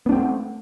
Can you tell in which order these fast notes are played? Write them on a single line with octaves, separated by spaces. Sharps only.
B3 D4 C4 A3